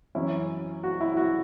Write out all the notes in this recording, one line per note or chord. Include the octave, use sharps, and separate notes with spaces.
F#2 E3 C#4 E4
F#4
E4
F#4